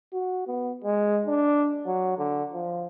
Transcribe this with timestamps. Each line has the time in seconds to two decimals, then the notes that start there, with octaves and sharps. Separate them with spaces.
0.13 F#4
0.47 B3
0.84 G#3
1.26 D4
1.86 F#3
2.18 D3
2.53 F3